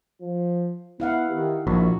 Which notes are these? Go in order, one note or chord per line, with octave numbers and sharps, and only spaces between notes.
F3
B3 E4 F5 F#5
D#3 G4
A#1 A#2 F#4